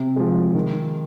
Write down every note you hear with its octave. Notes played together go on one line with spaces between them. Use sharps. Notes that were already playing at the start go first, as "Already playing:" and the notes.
Already playing: C3
F3 G#3
D#3